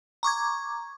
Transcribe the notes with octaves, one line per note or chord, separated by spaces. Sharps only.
A#5 C#6 D6 G#6